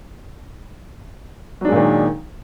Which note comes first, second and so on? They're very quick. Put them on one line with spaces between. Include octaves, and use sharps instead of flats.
F#3 D4 G#3 A#2 D#3